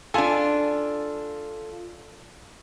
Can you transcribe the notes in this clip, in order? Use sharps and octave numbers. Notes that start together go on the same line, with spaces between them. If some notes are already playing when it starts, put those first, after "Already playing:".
D4 F4 A4 G#5